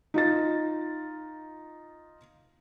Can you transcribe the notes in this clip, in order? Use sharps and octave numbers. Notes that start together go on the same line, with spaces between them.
D#4 F4 A6